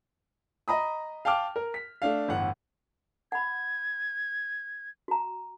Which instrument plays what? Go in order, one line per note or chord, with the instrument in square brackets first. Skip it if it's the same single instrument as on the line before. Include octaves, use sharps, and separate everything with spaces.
[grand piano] D#5 A#5 B5 D#6
F5 G5 A5 D6 F6
A#4
B6
A3 D4 F5
G1 E2 A2 F#5
[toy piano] F#5 B5 [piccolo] G#6
[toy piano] F#4 A#5